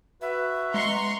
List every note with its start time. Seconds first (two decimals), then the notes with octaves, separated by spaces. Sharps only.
0.22 F#4 B4 E5
0.74 G#3 A#5 C6 C#6